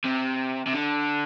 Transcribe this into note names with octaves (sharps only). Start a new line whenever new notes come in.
C3
C3
D3